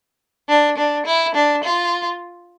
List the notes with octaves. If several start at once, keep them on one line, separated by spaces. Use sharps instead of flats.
D4
D4
E4
D4
F4